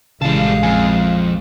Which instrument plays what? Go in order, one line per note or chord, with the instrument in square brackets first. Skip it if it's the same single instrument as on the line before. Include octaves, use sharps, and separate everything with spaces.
[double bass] A#1 G#3 [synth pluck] C#3 E3 [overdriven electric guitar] G3 A4 [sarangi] F5
[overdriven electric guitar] F2 [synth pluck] G#5